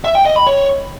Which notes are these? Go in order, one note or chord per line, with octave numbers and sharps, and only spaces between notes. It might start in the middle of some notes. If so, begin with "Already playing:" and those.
E5
G5
D#5
B5
C#5